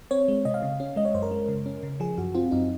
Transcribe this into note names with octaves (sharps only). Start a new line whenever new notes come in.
C4 C#5
G#3
C3 D#5
F5
C#3
C#4
G#3 D#5
C#5
F#2 C5
A#4
G#3
C#3
C#4
C#3
F3 G#4
F#2 F#4
C4 F4
F#2 D#4